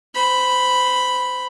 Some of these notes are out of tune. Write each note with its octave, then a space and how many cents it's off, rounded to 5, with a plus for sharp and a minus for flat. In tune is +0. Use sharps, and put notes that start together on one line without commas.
C5 -20 B5 +0